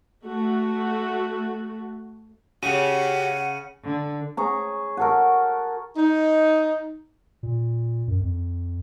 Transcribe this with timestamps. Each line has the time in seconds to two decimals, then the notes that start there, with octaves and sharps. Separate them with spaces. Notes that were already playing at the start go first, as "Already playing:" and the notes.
0.25 A3 F#4
2.63 C#3 F#4 G4 F#5 D#7
3.84 D3
4.37 G#4 C#5 A#5
4.97 F#4 A4 A#4
5.96 D#4
7.43 A#2
8.08 F#2
8.21 F2